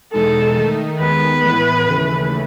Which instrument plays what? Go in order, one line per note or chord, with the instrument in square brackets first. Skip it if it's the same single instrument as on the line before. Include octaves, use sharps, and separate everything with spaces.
[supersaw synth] E2 B2 G#3 D#4 [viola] A4
[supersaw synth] D#3 A3 D#4
[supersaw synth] D#2 D#3 G#3 B3 [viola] B4
[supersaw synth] A2 E3 B3 E4
D#2 C#3 E3 A3